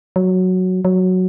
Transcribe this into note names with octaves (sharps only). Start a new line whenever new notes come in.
F#3
F#3